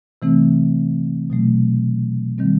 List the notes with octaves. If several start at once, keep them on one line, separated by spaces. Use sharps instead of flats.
C3 E3 A3 C4
B2 F#3 A3
D#3 G3 C4